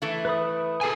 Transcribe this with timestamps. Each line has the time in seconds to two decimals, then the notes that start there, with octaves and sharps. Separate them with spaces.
0.02 E3 A3 E4
0.25 B4 B5 D#6
0.81 G#4 A4 G#5